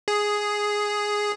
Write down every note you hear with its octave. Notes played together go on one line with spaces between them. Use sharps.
G#4